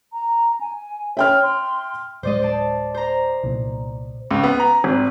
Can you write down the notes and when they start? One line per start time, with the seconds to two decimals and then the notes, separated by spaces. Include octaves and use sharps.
0.13 A#5
0.61 G#5
1.17 C#5 E5 G5 F6
1.43 C6
2.23 D1 G#3 C5 D5 D#5
2.42 C5 D5 A5
2.94 C5 A#5
3.44 C2 A#2
4.31 C#2
4.44 B3
4.60 A#5
4.84 G#1